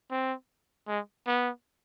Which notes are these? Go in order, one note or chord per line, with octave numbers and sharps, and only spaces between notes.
C4
G#3
B3